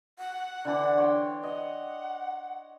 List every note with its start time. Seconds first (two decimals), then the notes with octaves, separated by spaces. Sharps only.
0.19 F#5
0.65 D3 E3 D4
0.98 C#5 G5 C6
1.43 D#5 F#5